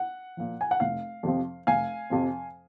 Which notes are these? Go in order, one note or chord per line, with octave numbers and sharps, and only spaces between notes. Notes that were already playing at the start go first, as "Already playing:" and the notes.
Already playing: F#5
A#2 F3
G#5
F#5
F1 F5
F2 C3 F3 C4
F1 F5 G#5
F2 C3 F3 C4